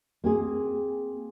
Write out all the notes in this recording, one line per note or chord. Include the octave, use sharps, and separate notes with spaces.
A#3 C4 G#4